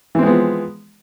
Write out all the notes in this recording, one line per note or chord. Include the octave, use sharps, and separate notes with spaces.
E3 F3 G#3 B3 C4